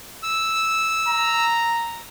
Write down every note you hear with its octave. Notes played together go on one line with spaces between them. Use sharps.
E6
A#5